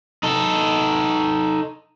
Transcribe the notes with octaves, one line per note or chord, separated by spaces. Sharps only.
D#4 A4